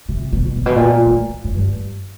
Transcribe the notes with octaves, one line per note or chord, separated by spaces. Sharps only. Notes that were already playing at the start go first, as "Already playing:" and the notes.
C3
B2
A#2
B2
A#2
A2
F#2
G2